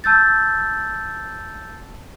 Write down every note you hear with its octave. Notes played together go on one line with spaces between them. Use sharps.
A5 E6 G6 A6